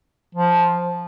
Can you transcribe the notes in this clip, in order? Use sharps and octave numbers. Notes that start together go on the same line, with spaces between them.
F3